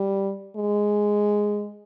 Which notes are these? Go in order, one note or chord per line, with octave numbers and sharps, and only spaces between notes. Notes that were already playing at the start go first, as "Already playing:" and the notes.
Already playing: G3
G#3